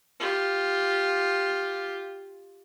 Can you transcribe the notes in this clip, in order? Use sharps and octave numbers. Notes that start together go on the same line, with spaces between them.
F4 G4